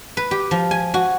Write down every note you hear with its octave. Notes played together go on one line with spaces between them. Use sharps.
B4
G4
F3
G#5
F#4